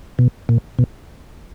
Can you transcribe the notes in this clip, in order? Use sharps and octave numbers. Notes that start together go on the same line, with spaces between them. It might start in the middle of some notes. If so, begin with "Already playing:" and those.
B2
A#2
B2